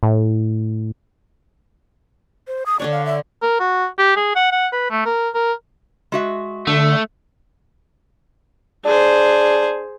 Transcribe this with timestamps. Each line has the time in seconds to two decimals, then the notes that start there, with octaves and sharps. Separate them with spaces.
0.03 A2
2.47 C5
2.66 D#6
2.80 D3 D4 C#5 D5
2.92 F5
3.06 E5
3.42 A#4
3.60 F#4
3.98 G4
4.16 G#4
4.35 F#5
4.52 F#5
4.72 B4
4.90 A3
5.05 A#4
5.34 A#4
6.12 G#3 F#4 E5
6.67 D3 A3
8.85 D4 G#4 C5